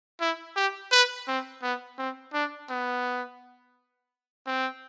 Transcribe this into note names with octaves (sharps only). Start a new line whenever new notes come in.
E4
G4
B4
C4
B3
C4
D4
B3
C4